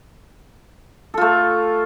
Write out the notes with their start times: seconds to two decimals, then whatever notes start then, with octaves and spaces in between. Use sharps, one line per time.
1.14 A4
1.18 F4
1.21 A3